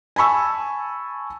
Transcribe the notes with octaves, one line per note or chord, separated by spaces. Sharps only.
G#5 A5 B5 C#6 E6